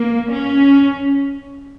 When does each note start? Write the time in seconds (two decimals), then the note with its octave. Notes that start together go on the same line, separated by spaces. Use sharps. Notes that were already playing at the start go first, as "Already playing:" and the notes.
Already playing: A#3
0.31 C#4